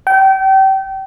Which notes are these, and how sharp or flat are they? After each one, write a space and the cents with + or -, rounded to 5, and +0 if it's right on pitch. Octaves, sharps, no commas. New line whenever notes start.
G5 -30